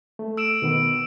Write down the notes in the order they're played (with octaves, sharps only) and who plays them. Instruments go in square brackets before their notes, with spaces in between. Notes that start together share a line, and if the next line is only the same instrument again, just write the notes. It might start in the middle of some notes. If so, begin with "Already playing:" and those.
[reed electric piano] A3
[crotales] E6 D7 E7
[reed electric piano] B2 D#3 B3